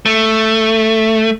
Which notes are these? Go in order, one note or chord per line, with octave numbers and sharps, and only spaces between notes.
A3